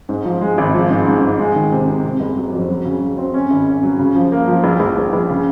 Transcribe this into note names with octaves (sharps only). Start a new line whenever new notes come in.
G#2
F3
G#3
G#1
F3
G#2
G#2
G#2
G#3
D#3
C3
C3
C3
F#1
F#3
F2
F#3
C#3
F#3
C4
C#4
G#1
C#4
F#3
C#3
F3
A#3
F3
A#1
A#1
A#1
A#1
C#3